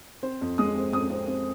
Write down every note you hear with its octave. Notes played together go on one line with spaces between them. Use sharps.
C4 C5
F2
G#3 D#6
C4
F2 D#6
C4
C4